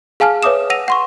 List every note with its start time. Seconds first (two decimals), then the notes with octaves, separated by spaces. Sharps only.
0.20 G#4 F5 G#5 A5 F6
0.43 B4 C#5 E5 D6 D#6 E7
0.70 F#5 E6 A#6 D#7 F7
0.88 F#5 C6 C#6